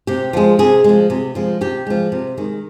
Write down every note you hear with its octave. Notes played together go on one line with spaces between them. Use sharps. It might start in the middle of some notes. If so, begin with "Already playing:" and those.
C3 G4
F3 G#3
C3 G#4
F3 G#3
C3
F3 G#3
C3 G4
F3 G#3
C3
D#3 G#3